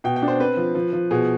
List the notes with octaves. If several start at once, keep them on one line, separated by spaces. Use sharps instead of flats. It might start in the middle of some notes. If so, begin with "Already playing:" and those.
B2 G5
G5
D4
C5
C4 B4
F3
F3
F3
B2 G#4